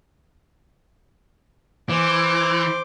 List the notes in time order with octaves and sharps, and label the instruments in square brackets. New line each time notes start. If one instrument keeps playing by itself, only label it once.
[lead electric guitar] E3 [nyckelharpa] C5 D6